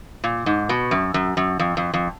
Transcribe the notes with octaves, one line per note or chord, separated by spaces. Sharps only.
A#2
G#2
B2
F#2
F#2
F#2
F2
F2
F2